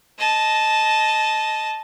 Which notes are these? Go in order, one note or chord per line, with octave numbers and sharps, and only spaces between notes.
D#5 A5